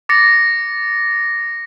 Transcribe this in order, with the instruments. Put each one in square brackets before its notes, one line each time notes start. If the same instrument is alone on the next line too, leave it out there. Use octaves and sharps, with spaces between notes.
[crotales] D6 A6 A#6 C#7